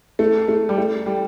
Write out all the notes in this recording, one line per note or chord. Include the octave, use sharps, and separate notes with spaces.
A3
A3
G3
A3
G3